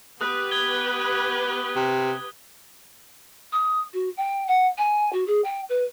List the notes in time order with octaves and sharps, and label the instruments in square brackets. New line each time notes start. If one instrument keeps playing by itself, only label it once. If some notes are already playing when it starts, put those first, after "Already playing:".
[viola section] B3 G4 B4 [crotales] D#6 F#6
[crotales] D#6 G#6 G7
[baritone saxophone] C3
[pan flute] D#6
F#4
G5
F#5
G#5
F#4
G#4
G5
B4